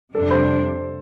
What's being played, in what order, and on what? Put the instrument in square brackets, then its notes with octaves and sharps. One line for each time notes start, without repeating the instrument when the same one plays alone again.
[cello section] F2 C3 G3 D4 [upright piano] A4
[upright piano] C5